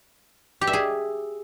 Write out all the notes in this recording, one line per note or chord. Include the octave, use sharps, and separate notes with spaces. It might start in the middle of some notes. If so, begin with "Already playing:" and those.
G4
E5
G#4